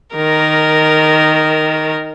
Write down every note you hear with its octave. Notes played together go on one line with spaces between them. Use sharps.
D#3 A#4